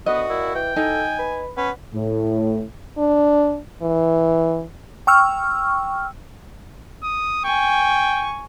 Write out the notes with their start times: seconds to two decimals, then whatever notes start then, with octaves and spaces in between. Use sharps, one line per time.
0.06 D2 B3 F#4 D#5
0.29 A#2 E4
0.55 E3 G5
0.76 D#4 A4 G#5
1.19 B4
1.57 B3 C#4 B4
1.93 A2
2.98 D4
3.82 E3
5.07 G5 C#6 E6 F6
7.03 D#6
7.45 G5 G#5 C#6